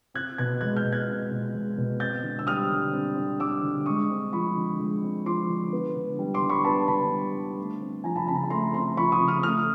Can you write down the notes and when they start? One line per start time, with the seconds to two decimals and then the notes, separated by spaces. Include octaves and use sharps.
0.14 C4 F#6 G#6
0.38 B2 F#6 G#6
0.61 G#3 F#6 G#6
0.76 F6 G6
0.84 B2
0.92 F#6 G#6
1.08 C4
1.31 B2
1.55 G#3
1.78 B2
2.00 C4 G6 A6
2.24 D3
2.39 E6
2.47 G3 D#6 F6
2.71 D3
2.93 C4
3.17 D3
3.40 G3 D6 E6
3.63 D3
3.86 G#3 C#6 D#6
4.10 C4
4.33 F3 B5 C#6
4.57 D3
4.80 G#3
5.03 C4
5.26 F3 C6 D6
5.49 D3
5.73 B3
5.96 D3
6.19 G3
6.34 C6 D6
6.42 D3
6.50 B5 C#6
6.64 B3 A5 B5
6.88 D3 A5 B5
7.11 G3
7.35 D3
7.59 A3
7.81 C4
8.04 F3 G#5 A#5
8.16 A5 B5
8.27 C#3 A5 B5
8.35 A#5
8.43 B5
8.50 A3 A#5 C6
8.74 C4 A#5 C6
8.97 F3 B5 C#6
9.12 C#6 D#6
9.20 C#3
9.28 D#6 F6
9.43 A3 D#6 F6